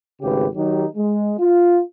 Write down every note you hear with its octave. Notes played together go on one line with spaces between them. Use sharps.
G#1 C#3 A3 G4 B4
D#3 F#3 D#4 G4
G#3
F4